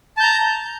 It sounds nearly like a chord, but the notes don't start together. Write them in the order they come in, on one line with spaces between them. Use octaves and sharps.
A5 G6 A#5